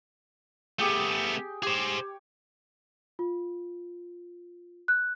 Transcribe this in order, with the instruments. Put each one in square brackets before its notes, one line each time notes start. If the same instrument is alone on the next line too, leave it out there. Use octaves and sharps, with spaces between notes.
[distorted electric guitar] A3 B3 [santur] G4 G#4 G5
[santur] G4 C#5 [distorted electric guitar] G#4 C5
[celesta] F4
F#6